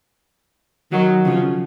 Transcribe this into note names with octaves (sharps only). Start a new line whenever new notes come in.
D#3 F#3
C#3 F3